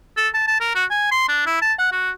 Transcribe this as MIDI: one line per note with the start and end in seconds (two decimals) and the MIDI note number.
0.17 0.28 69
0.34 0.47 81
0.47 0.57 81
0.60 0.74 70
0.75 0.85 66
0.90 1.09 80
1.11 1.28 84
1.28 1.46 62
1.46 1.58 64
1.62 1.73 81
1.79 1.88 78
1.92 2.10 66